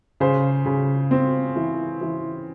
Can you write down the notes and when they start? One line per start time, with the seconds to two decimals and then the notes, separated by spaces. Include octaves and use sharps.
0.20 C#3 C5
0.66 C#3
1.11 C4
1.56 E3
2.01 E3